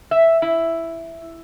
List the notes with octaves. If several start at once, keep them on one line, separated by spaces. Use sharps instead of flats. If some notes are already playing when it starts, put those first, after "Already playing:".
E5
E4